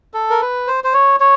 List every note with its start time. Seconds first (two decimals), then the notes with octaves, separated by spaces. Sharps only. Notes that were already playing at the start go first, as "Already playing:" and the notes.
0.14 A4
0.30 A#4
0.41 B4
0.68 C5
0.84 C5
0.94 C#5
1.20 C#5